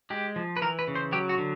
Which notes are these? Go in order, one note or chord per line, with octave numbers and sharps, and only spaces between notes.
G#3 G4
F3
B4
E3 A#4
B4
C#3
C5
F#3 G4
F#4
D3